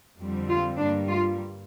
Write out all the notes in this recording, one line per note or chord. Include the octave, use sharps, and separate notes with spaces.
F2 D3 G3 C4
F4
G2 G3 A#3 D4
F4